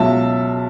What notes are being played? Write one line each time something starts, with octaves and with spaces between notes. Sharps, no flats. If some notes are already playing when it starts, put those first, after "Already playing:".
Already playing: C#2 B2 F#3 E5 A5